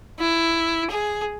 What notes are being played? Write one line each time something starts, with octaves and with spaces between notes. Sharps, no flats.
E4
G#4